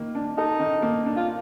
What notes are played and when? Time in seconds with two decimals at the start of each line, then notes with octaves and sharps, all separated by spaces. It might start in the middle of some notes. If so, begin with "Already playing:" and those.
Already playing: D#3 A#3
0.15 D4
0.37 D#4 A4
0.59 D#3
0.82 A#3
1.06 D4
1.17 F4